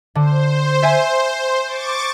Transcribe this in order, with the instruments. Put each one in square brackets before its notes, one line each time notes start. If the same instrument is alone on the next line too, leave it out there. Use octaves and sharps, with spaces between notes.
[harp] D3 [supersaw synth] C5
[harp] E5 G#5 D#7
[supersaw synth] C#6 D6 A6